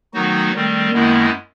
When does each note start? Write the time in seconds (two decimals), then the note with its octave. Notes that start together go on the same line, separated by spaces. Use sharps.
0.13 D#3 F#3 A3 B3 D#4 F#4
0.52 D#3 G3 A3 C4
0.91 F#2 D#3 G#3 A#3 B3 E4